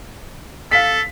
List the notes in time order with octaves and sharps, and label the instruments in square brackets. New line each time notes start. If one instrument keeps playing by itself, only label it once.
[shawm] A4 [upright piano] F5 B6